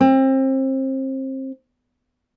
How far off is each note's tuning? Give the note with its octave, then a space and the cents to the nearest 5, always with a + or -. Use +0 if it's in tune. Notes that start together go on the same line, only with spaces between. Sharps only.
C4 +30